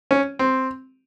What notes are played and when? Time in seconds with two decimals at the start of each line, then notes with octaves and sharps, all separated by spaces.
0.11 C#4
0.39 C4